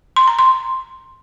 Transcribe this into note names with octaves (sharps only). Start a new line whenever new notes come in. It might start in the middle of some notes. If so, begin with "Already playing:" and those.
C6
A#5
C6